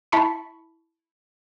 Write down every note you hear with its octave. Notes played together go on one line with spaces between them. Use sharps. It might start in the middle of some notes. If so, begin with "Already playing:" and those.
E4 A5 B5 C#6